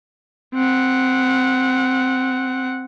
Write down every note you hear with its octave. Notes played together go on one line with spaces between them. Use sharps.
C4 F#5